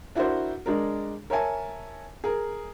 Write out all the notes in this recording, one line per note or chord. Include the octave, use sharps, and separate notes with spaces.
D4 E4 F#4 A#4 C5
G#3 D4 A#4
A#4 C#5 E5 G#5 A5
G#4 A#4